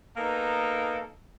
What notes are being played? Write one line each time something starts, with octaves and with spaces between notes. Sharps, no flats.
A#3 B3 D#4 A4